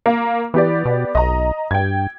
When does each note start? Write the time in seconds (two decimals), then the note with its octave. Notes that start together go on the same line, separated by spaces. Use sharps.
0.06 A#3
0.54 E3 B3 G4 D5
0.85 B2
1.15 B1 D#5 A#5
1.71 G2 G5 G#6